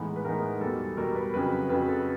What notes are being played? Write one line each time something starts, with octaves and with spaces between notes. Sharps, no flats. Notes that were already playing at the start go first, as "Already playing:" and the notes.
Already playing: A2 E3 G#3 B3 D#4
B4
A2 E3 G#3 B3 D#4 A#4
E2 B2 G3 A4
E2 B2 G3 A#4
B4
F2 C#3 F#3 B4
F2 C#3 F#3 B4
A4